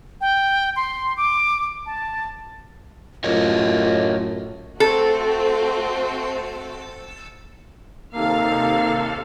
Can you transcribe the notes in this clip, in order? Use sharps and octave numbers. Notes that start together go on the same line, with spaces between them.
G5
C6
D6
A5
F#2 A2 F4 A#4 C#5 D#5
A3 C4 F#4 A4
D#2 C3 A#3 D#4 A4 F5